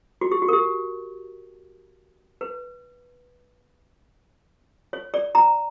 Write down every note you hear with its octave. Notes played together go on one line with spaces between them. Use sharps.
F#4
G4
F#4
A#4
G4
B4
C#5
D5
A#5